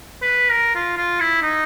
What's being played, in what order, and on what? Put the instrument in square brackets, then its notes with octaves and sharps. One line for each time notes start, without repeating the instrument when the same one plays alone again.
[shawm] B4
A#4
F4
F4
E4
D#4